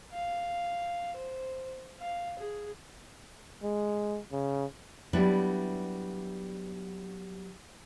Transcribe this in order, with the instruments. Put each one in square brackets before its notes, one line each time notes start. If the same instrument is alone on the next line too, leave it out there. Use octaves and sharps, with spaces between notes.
[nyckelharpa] F5
C5
F5
G#4
[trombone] G#3
C#3
[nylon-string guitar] F#3 G3 B3 D4 E4